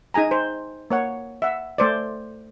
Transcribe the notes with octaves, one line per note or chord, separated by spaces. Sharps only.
D#4 G#4 G#5 A#5
C5
A#3 C#5 F#5
E5 F#5
A3 C5 D5